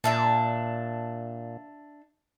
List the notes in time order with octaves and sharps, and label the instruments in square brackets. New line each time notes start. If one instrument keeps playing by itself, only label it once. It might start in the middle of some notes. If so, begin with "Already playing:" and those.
[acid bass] A#2 [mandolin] D4 E5 A5